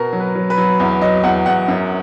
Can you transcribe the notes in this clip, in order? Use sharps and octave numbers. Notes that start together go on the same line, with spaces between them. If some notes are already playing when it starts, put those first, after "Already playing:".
Already playing: B2 A#4
F#3
B4
F#3
B4
F#3
E2
F#3 D#5
E2 F#5
E2 F#5
F#2